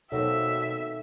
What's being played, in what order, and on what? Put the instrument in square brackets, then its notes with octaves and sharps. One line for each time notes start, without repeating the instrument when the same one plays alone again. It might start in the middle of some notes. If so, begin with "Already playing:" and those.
[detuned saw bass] B2 [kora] F#3 A#3 C4 [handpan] D#4 A4 [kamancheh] E5